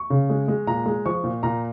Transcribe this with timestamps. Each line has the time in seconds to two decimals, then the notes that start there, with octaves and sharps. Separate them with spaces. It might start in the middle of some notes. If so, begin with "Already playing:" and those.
Already playing: C#6
0.10 C#3
0.30 G#3
0.48 G#3
0.67 A#2 A#5
0.86 G#3
1.06 F3 C#6
1.24 A#2
1.43 A#2 A#5